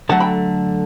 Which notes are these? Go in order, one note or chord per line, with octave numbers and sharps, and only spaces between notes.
D3 F#3 A3 F#5 A5
G5 B5